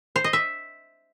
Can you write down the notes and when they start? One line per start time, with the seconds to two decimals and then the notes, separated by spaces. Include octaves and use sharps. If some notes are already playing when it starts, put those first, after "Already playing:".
0.16 C5
0.24 D#5
0.33 E5